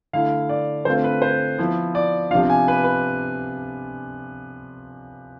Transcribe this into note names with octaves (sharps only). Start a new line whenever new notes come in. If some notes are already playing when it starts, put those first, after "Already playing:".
D3 A3 E4 F5
D5
D3 A3 C4 F4 C5
B4
C5
F3 B3 E4
D5
C3 F3 B3 D4 F4 F5
G#5
B4
B4